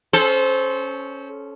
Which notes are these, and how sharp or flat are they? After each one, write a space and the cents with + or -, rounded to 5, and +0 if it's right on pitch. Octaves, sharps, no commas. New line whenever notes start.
C#4 +0 A4 -30 C5 +0